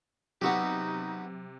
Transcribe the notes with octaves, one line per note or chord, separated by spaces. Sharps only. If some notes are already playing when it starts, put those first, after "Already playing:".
C3 F#3 B3 D#4 F#4 G4 E6